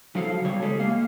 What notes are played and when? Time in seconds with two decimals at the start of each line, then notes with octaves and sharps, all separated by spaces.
0.15 C#3 F3 F#3 A4 F5
0.45 C#3 G3 C#5
0.63 G#3 G4 A4
0.79 A#3 F5